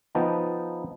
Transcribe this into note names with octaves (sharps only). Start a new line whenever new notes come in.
F3 B3 D#4 G5 A5